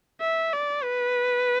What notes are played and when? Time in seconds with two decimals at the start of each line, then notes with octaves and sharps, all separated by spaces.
0.21 E5
0.53 D5
0.84 B4